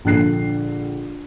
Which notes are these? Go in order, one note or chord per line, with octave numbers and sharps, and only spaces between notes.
A#1 D3 F#6 C7